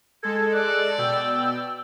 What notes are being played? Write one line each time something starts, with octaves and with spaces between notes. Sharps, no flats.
G#3 A4 G#6
D5 F#6
B2 G5 E6